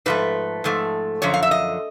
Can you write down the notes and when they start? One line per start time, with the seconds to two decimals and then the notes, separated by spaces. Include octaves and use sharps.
0.06 G#2 F3 A3 B4
0.64 G#2 F3 A3
1.22 F#2 D3 F3 C#5
1.34 F5
1.43 E5
1.51 D#5